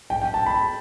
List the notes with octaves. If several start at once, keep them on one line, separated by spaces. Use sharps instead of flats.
G5
G5
A5
B5